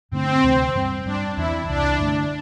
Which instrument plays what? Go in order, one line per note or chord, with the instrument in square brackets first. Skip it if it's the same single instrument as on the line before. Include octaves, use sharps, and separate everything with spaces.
[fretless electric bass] G2 D3 A3 D4 [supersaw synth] C4
[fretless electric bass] D2 C3 E3 A3
G2 G3 C4
[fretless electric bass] G2 G3 C4 [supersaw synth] D4
[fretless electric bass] E2 E3 C4 [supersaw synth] E4
[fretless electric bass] C2 C3 E3 [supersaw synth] D4
[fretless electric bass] G2 D3 A3